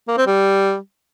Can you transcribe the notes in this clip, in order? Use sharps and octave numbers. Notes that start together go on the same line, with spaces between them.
A#3
C4
G3